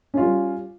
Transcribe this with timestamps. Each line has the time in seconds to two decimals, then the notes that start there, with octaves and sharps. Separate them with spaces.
0.14 C#4
0.17 F4
0.21 G3